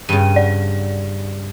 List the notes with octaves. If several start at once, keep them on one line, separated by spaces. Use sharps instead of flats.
G2 C#3 D#7
D5